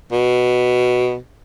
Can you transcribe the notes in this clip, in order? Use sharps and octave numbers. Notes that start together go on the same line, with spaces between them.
B2